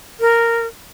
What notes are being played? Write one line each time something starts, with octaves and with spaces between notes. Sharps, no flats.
A#4